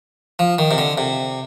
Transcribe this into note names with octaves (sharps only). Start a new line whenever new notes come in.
F3
D#3
C3
D3
C3